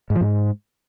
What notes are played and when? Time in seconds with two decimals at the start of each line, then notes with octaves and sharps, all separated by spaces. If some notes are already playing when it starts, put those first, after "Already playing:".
0.10 G#2
0.15 F3
0.21 G#2